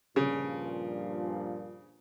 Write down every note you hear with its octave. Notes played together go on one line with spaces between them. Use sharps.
G2 A#2 C#3 F3